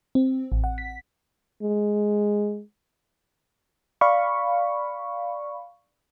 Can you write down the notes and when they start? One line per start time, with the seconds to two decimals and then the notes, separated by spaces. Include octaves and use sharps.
0.15 C4
0.52 A1
0.64 F#5
0.78 B6
1.63 G#3
4.01 D5 F5 B5 C#6